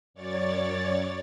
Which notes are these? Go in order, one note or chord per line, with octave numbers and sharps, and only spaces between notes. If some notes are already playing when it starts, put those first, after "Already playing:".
F#2 C#5 D5 A6